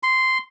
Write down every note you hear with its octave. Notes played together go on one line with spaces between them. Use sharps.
C6